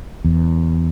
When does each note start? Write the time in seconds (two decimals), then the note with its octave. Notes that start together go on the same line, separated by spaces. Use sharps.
0.25 E2